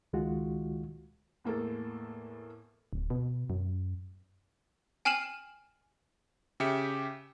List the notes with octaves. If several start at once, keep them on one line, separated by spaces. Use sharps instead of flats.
C#2 D#3 G#3 F4 F#4
E2 A2 A#3 G#4 A4
D1
B2
F#2
G5 G#5 F6 C7 E7 F#7
C#3 G4 E5 C#7